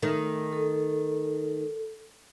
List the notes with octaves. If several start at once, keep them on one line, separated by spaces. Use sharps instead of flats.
D#3 A3
A4